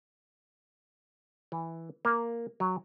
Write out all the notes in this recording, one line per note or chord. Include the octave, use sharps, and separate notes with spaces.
E3
A#3
F#3